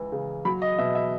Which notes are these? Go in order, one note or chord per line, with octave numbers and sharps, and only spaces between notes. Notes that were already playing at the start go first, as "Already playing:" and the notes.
Already playing: C#2 E3
C#3
F#3 B5
D#5
B2 E5
E5